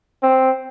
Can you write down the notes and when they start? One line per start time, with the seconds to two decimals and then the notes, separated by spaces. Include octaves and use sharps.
0.23 C4